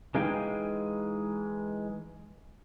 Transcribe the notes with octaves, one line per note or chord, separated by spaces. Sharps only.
E3 G#3 D#4 F5 G5 G#5